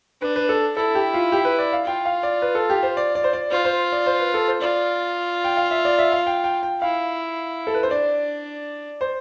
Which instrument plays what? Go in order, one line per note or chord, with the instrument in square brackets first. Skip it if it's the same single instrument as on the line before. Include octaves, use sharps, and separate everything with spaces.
[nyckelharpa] D4 [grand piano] B4
[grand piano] B4
A4
[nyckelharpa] E4 [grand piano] A4
[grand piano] G4
F4
G4
B4
D5
F5
[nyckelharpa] F4 [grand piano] G5
[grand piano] F5
D5
B4
A4
G4
C5
D5
D5
C5
D5
[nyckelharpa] F4 [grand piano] C5
[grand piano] C5
D5
C5
B4
A4
C5
[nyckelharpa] F4 [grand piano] D5
[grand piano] G5
F5
E5
D5
E5
F5
G5
G5
G5
[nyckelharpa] E4 [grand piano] F5
[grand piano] A4
B4
C5
[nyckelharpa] D4 [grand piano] D5
[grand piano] C5